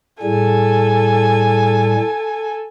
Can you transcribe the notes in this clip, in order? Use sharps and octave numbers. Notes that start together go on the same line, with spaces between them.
A2 G3 G#4 A4 G#5